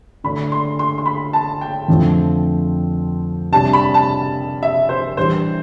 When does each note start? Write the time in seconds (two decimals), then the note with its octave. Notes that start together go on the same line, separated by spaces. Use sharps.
0.24 D3 A3 D4 B5
0.52 C6
0.79 C6
0.98 C6
1.06 B5
1.33 A5
1.61 G5
1.88 F2 D3 F3 A3 C4
3.52 C3 G3 D4 G4 A5
3.73 B5
3.94 A5
4.63 E5
4.89 C5
5.17 E3 G3 D4 G4 C5